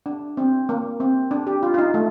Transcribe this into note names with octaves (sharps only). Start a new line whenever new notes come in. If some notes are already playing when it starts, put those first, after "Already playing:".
D4
C4
A#3
C4
D4
G4
F4
F4
D#4
A3